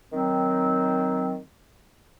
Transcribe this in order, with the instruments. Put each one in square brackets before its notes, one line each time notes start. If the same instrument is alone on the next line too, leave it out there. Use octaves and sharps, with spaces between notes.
[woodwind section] D#3 F#3 C4